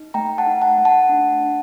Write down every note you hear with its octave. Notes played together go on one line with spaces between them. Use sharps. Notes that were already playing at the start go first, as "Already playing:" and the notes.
Already playing: D#4
A3 G5 A#5
F#5 A5
D#4
F#5 A5
A3
F#5 A5
D4
D4